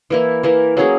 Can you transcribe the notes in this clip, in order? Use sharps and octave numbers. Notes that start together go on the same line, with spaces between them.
E3 A#3 E4
E3 A#3 E4
F#3 A#3 C#4 G#4